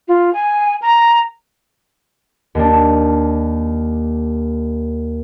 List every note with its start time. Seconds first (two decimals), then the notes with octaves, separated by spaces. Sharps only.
0.08 F4
0.33 G#5
0.82 A#5
2.55 D#2 D4